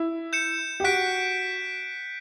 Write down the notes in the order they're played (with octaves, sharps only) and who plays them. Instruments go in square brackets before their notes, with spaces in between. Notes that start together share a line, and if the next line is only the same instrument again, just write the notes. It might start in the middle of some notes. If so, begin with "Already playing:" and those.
Already playing: [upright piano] E4
[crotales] G6 C#7 E7
[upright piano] G4
[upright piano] F#4 [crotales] F#6 B6 D7